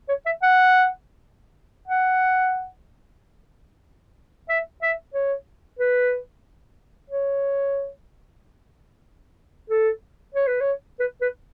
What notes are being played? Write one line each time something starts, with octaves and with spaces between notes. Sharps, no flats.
C#5
E5
F#5
F#5
E5
E5
C#5
B4
C#5
A4
C#5
B4
C#5
B4
B4